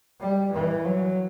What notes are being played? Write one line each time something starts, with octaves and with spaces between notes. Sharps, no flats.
G3
E3
F#3